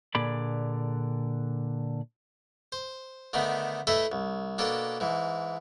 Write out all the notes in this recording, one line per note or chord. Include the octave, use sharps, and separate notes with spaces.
A#2 D3 D4 G#4 D5 B5
C5
D3 D#3 A3 B3
A3 E4 A4 B4 D#5
C2
B2 A#3 D4 A4
G#2 E3